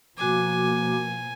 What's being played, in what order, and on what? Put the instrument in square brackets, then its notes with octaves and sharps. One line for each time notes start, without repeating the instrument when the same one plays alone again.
[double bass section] B2 F3 A#3 [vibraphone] F#4 D6 [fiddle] G#5